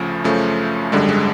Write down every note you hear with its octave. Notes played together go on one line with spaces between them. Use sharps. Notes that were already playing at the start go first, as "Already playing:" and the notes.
Already playing: D2 C#3 F3 A3
F#2 C#3 F3 A3
G#1 F#2 D3 G3 G#3
G#3